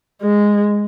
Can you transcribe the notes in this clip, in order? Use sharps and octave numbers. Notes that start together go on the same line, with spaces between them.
G#3